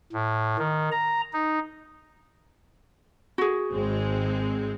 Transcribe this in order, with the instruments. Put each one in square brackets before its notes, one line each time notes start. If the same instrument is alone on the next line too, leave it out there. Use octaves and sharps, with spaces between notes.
[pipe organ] A2
D#3
A#5
D#4
[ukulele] F#4 G#4
[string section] G#1 G#3 C4